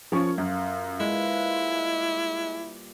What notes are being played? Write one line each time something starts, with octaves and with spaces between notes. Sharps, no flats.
C#3 F3 C#4 A4 A#4 C#6
F#2 F4
A#2 F3 G#3 E4 B4
G3 D6